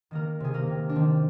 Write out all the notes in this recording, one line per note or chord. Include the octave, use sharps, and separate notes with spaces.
D#3 A#3 A#4
C3 G#4
A#3 A#4
C3
D4
D#3 C4